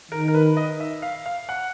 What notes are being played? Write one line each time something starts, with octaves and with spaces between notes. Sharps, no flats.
D#3 A#4
A#4
B4
D#5
E5
F5
F5
F#5